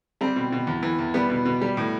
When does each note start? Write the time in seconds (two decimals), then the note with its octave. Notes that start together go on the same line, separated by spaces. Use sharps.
0.21 G3 C4
0.36 B2
0.52 B2
0.67 E2
0.83 E3
0.99 E2
1.14 G3 B3
1.30 B2
1.45 B2
1.62 G3
1.77 A2